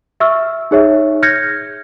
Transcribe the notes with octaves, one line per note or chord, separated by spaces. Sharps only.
E5 C#6 E6 F6
D#4 G#4 C#5 E5
F6 G6 G#6 A#6 C#7